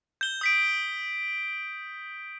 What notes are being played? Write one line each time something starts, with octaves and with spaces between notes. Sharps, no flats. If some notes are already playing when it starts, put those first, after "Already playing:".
G6 G7
D#6 B6 D7